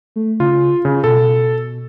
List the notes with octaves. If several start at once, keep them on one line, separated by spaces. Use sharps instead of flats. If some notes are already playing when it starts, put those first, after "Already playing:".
A3
C#3 F4
C#3 F4
B2 A4